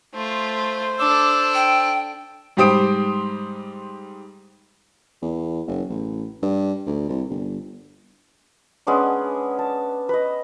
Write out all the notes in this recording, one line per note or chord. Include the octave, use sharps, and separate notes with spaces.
A3 F4 C5
D4 A4 D6 E6
G5
G#2 G3 G4 C5 D#6 D7
E2
F#1
A1
G2
D2
C2
G1
G#3 B3 C#4 D4
A5
B4 D#5